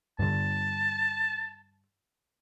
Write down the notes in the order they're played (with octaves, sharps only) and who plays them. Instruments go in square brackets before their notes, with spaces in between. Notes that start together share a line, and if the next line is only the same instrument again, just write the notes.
[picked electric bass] G2 D3 [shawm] A5